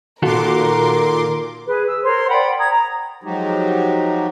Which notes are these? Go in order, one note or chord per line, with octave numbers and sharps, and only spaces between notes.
A#2 D#3 F4 F#4 A4 A#4 C6 D6
G#4 B4
E6
A#4 C5 C#5 C6
D5 F#5 G5 B5
A#5 D#6 G#6
A#5
F3 F#3 G#3 D#4 F#4 G4